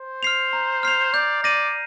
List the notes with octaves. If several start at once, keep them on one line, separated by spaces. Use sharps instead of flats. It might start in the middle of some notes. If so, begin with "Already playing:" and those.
Already playing: C5
F6 C7 F7
A#5
F6 C7 F7
D5 G6
D5 A#6 D#7